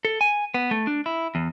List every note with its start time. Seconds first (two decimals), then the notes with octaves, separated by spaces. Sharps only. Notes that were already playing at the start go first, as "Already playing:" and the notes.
0.05 A4
0.21 G#5
0.54 B3
0.71 A3
0.87 D4
1.06 E4
1.35 E2